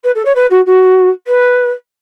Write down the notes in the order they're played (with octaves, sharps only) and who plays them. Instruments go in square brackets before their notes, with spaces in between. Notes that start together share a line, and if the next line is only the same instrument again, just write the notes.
[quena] B4
A4
C#5
B4
F#4
F#4
B4